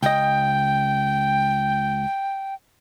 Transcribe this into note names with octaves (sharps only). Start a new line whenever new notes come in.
C#2 D#5 G5